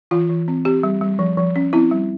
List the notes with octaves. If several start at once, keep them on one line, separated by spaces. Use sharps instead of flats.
E3 F4
E3
C4
C4 G4
G3
G3
F3
F3
C#4
C4 E4
G3